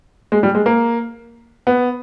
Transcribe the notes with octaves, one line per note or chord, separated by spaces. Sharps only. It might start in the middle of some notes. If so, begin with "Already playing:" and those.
G#3
G3
G#3
A#3
B3